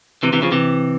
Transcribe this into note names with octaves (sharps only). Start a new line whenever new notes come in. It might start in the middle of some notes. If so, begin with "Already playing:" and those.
C3 E3
C3 E3
C#3 F3
C3 E3